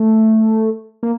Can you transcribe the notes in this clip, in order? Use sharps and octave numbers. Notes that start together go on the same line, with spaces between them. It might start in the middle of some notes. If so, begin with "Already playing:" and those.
Already playing: A3
A#3